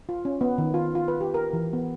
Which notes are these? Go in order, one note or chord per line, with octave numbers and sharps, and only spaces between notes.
F4
C#4
B3
D#3
F4
F4
B4
G4
A#4
E3
B3